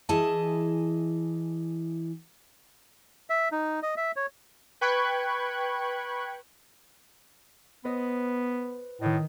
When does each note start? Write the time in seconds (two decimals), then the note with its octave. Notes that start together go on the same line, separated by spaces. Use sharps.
0.09 E3 E4 G#4 D#5 A5
3.30 E5
3.52 D#4
3.83 D#5
3.97 E5
4.16 C#5
4.81 B4 G5 B5 C#6 F#6 G#6
7.85 B3 B4 C5 D#5
9.01 A2 D#3 D#5